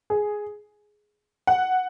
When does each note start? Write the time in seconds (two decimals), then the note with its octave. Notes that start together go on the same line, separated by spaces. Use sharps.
0.10 G#4
1.47 F#5